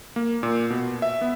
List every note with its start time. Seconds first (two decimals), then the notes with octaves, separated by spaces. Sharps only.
0.16 A#3
0.43 A#2
0.70 B2
1.02 E5
1.21 B3